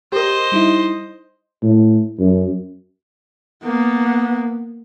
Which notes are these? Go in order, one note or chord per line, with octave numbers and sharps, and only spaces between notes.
G4 A#4 C5 D#5
G3 D#4 E4
A2
F#2
A#3 B3